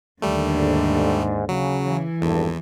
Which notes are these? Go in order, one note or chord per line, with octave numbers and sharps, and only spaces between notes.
D#2 D3 G3 A3
G#2
C#3 F#3
E3
G#1 E2 G2 A4